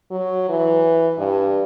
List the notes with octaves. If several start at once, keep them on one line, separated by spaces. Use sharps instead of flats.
F#3
E3
G2